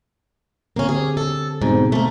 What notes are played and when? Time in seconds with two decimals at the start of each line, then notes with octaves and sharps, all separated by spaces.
0.76 D3 A#3 C4 C#4
0.89 G4 G#4
1.17 A4
1.62 G#2 B2 C4
1.92 A3 A#3